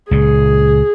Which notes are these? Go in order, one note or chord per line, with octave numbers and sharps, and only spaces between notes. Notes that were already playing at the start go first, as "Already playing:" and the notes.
C#2 A#2 G#4